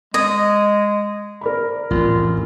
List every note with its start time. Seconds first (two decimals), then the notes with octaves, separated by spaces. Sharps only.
0.14 G#3 D#5 G#6
1.41 A#4 D5 B5
1.91 A1 F2 F4